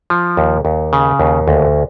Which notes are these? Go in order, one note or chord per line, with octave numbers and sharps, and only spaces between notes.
F3
D#2
D#2
C#3
D#2
D2